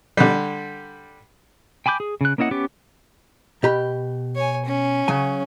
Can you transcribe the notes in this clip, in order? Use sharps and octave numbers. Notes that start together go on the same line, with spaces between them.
D3 G3
G5 G#5 B5 D6 G6
G#4
C#3 F#6
A#3 C#4 E4 D#5 F#5
B3 C#4 G4 D6
B2 G4 B5
C#5 G#5
C#4
C#3 F#3 G#5